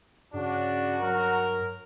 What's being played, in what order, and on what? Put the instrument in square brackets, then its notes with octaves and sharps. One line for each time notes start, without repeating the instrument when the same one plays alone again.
[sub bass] G2 [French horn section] C#3 [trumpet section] D4 [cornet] F#4
[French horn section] F#3 [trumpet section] A#4